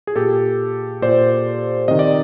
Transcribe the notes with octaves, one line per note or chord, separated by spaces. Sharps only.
G#4
A#2 G4 A4
A#2 C5 D5
C3 D#3 D#5
D5